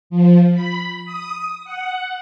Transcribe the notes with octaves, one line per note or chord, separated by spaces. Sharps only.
F3
B5
D#6
F#5